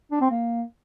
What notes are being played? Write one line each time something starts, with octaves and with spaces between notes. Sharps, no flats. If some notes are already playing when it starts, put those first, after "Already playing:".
D4
C4
A#3